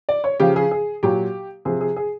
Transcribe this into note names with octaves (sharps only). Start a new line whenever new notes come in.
D5
C#5
C#3 F3 G4
G#4
G#4
A#2 F#3 G4
C3 F3 G#4
G#4
G#4